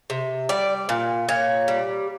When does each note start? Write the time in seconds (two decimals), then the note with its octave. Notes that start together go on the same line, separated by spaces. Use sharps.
0.10 C3
0.49 G3 D5
0.89 A#2
1.29 A#2 C#5
1.68 G3